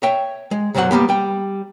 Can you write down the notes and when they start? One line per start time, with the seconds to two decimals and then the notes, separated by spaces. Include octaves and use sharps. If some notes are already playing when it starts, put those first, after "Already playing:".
0.03 C#5 E5 G5
0.51 G#3
0.74 C2 F#2 B2 F#3 C5 F#5
0.91 G3 A#3 B3 G4
1.09 G3 G5